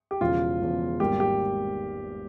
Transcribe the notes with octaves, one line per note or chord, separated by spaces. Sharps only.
G4
E1 E2 C#3 F3 F4
E1 E2 C#3 F3
G#1 G#2 G3 A#3 G4
G4